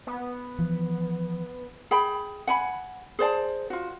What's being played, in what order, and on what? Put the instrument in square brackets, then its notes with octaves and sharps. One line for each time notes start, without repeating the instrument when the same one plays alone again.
[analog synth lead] B3
[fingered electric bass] E3 F3
[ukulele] G#4 G5 B5
F#5 G#5 B5
G#4 C5 D5 A5
F4 F#4